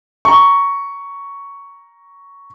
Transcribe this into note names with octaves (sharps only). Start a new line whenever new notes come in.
A#5 C#6